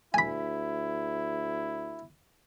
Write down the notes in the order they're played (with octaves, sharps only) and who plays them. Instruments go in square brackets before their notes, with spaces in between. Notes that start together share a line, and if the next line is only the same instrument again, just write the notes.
[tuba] D2 [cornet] E4 [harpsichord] G#5 B5